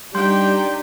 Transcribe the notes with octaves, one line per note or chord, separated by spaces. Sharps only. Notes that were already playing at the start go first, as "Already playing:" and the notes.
G3 D4 D#4 G4 G5 C6 G6